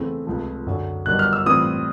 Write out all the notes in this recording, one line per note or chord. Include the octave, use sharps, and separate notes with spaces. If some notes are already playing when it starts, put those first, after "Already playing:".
Already playing: E2 C#3 E3 A3 C4
C#2 C3 F3 A3
F#2 D3 F#3
G1 G2 D#3 F#3 F#6
F6
E6
A2 E3 G3 C4 F4 D#6